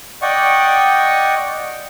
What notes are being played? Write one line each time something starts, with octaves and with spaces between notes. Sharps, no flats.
D5 D#5 F#5 G5 C#6